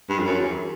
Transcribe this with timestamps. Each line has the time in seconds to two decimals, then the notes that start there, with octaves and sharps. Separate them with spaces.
0.09 G2
0.19 F2
0.25 F#2
0.41 E2